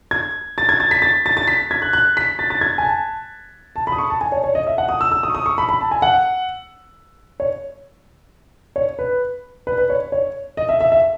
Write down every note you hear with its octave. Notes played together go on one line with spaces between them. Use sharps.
G#6
A6
G#6
A6
B6
A6
A6
A6
B6
G#6
F#6
F#6
B6
A6
A6
G#6
G#5
A5
A5
B5
D#6
C#6
A5
G#5
C#5
C#5
D#5
E5
F#5
D#6
E6
E6
D#6
C#6
D#6
C#6
B5
B5
A5
G#5
F#5
C#5
C#5
B4
B4
B4
C#5
C#5
D#5
E5
E5
E5